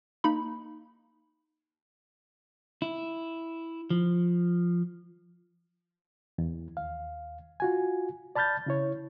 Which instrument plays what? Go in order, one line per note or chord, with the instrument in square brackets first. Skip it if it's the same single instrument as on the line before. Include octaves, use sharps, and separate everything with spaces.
[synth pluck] A#3 D#4 B5
[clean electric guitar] E4
F3
[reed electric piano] E2
D#2 F5
F4 F#4 G#5
D5 A5 B5 F6 G6 A6
C#3 E4 C#5